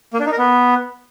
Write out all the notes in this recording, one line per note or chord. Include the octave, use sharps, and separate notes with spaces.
A#3
D4
D#4
A#4
B3